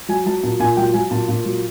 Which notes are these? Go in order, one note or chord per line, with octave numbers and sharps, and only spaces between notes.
F#3 G#5
F#3 A5
A#2 A5
A#2 G#5
F#3 G5
F#3 G#5
A#2 A5
A#2
F#3